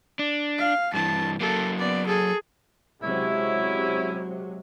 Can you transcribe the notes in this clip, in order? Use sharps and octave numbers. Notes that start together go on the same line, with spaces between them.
D4
F5
G2 E3 A5
F#3 A#3 A4
B3 D5
G#4 A4
C3 F#3 G#3 C#4 E4